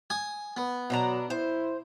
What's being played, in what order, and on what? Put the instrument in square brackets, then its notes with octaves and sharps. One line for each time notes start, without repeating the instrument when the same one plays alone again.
[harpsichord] G#5 D#6
B3
[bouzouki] B2 D4 A#5 [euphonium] F#3
[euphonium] E4 [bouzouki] C5